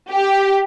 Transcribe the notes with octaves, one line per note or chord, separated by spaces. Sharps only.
G4